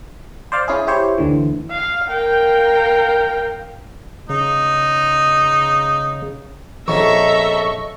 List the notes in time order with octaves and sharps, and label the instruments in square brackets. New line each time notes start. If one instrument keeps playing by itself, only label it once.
[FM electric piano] C5 D5 F5
C#4 E4 G#4
E4 G4 C5 C#5
D2 D3 E3
[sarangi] F5
[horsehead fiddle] A#4 F5 [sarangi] G5
[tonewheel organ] C#3 [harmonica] D#4
[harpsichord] A#1 F2 C#4 [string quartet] A4 E5 A#5 [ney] D#5 [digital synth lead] C#6